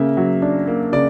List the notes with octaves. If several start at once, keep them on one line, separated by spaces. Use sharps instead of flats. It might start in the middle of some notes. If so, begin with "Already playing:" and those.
Already playing: C#3 A#3 E5
F#3
D4
A#3
C#3 D5